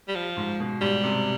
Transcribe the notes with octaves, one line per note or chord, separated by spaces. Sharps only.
G3
F3
G#2
B2
G#2 G3
C3